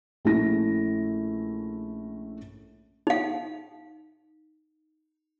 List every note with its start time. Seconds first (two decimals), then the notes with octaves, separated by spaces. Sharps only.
0.25 A#1 A3 C#4 E4 A#6
3.07 D#4 F5